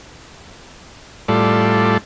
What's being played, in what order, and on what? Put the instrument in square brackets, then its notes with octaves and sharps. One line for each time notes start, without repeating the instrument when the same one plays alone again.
[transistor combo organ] A2 G3 F4 A4 D5